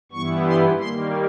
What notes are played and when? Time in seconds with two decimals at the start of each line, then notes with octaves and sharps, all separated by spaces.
0.12 G2 E3 G3 B3 E4 C#6
0.46 C6
0.79 D#3 G3 A#3 C6